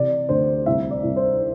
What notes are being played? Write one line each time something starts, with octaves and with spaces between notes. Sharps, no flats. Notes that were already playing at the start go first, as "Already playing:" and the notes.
Already playing: C3 E3 D5
D2 C5
C2 E5
D5
C2
C5